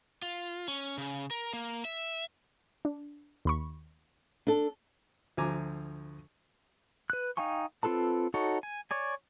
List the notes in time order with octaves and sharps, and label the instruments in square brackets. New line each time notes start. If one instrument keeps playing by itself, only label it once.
[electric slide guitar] F4
C#4
C#3
A#4
A#3
E5
[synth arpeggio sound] D4
D#2 B5 C#6
[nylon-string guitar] D4 A4
[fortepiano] D2 F3 G#5 A#5 D6
[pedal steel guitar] B4 F#6
D#4 F5 G5 G#5 C#6
C4 F4 A4 B4 A5
D#4 F#4 A4 C#5
G#5
C#5 D5 G#5